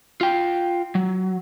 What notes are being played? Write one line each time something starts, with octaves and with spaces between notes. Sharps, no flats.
F4 G5
F#3